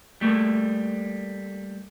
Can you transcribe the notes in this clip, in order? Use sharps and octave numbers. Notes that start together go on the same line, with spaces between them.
G3 A3 A#3